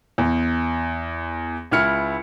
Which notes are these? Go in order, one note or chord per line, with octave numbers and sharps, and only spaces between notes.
E2
C#2 E4 F6 C#7